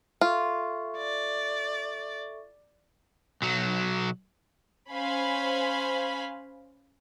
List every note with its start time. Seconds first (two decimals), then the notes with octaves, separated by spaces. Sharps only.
0.21 F4 A4 E5 C#6
0.97 D5
3.42 B1 F#3
4.92 C#4 C5 F5 G#5 B5